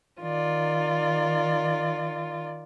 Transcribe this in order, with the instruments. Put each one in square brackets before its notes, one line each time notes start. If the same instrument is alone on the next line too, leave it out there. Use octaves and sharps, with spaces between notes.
[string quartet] D#3 F4 D5